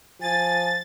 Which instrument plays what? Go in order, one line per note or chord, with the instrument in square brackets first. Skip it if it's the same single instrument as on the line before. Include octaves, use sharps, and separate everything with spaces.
[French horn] F3 [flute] G#5 [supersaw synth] A6